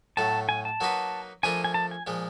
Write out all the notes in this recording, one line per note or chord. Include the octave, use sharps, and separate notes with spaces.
A2 F#3 A3 A5
G#5
A5
F#3 A#3 D#4 F#4 B4
F3 A3 D4 F4 A#4 G#5
G#5
A5
G#5
A#2 F3 G#3